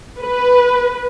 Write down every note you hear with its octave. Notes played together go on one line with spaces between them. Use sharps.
B4